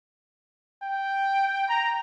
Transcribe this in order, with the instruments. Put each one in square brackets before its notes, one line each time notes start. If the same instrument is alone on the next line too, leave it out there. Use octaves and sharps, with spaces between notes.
[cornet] G5
[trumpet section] A#5